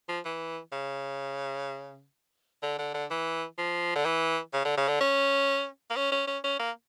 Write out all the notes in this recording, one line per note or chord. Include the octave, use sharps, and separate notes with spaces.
F3
E3
C#3
D3
D3
D3
E3
F3
D3
E3
C#3
D3
C#3
D3
C#4
A#3
C#4
C#4
C#4
C#4
A#3